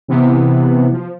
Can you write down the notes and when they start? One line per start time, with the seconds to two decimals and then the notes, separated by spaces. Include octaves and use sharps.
0.08 C3 E3 B3
0.92 F3